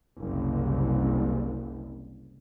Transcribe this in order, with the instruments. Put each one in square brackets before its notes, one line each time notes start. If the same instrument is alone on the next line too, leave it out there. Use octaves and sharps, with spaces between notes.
[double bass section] F#1 C2